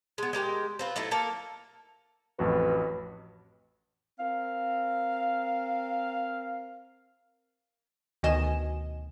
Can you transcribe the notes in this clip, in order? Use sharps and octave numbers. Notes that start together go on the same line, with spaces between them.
G#3 B3
G#3 G4 A#4 G5
C4 F4 B4
F#3 A3 D#4 E4
A#3 A4 A#4
A1 F2 F#4 B4
C4 A#4 F5
D2 B2 D#3 D#5 G#5 E7